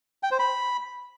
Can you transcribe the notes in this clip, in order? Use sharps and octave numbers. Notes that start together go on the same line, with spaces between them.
G5
C5
B5